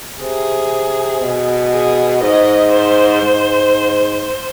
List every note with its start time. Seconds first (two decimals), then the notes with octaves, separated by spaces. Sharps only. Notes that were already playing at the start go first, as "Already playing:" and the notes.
0.21 C3 G#4
1.21 B2
1.72 G#4
2.22 G#2 D#5
2.72 C5
3.22 G#2